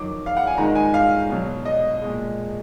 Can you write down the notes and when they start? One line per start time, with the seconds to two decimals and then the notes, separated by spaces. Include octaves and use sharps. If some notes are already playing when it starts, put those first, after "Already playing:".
Already playing: F2 D#3 F#3 D6
0.26 F5
0.37 F#5
0.47 G#5
0.57 G#2 D#3 G#3 A#5
0.75 G#5
0.94 F5
1.30 B2 F#3
1.65 D#5
2.02 A#2 G#3